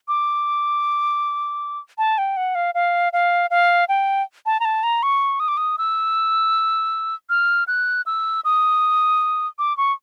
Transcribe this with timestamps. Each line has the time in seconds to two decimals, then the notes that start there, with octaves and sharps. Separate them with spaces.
0.08 D6
1.98 A5
2.18 G5
2.37 F#5
2.55 F5
2.75 F5
3.13 F5
3.50 F5
3.89 G5
4.46 A5
4.60 A#5
4.65 A5
4.83 A#5
5.03 C#6
5.40 D#6
5.48 D6
5.57 D#6
5.78 E6
7.30 F6
7.68 F#6
8.06 E6
8.45 D#6
9.59 D6
9.77 C#6